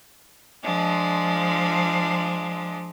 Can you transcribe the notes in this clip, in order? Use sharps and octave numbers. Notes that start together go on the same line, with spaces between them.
F3 G#3 D4